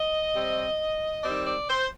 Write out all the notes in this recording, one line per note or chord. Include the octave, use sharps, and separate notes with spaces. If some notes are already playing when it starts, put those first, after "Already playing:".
Already playing: D#5
C3 G3 C4
D#3 G3 C4 D5
D5
C5